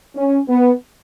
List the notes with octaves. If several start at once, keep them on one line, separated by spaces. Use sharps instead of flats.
C#4
B3